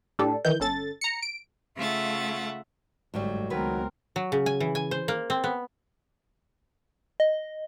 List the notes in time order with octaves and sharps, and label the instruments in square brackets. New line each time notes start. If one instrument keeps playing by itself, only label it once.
[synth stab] A2 D4 G4 A4
D#3 E3 G6
G1 C#4 A4 A6
A#5 C#7
D7
[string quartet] C#3 A3 F4 E5 F#5 A6
[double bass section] G1 A3 [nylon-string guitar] G#2 F#3 G3
[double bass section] C#2 G#3 B3 [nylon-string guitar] D#3 B4 [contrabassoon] F#3 [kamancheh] C4 A#4
[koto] F#3
C#3
G#5
E3
G#5
C5
A#3
C4
B3
[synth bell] D#5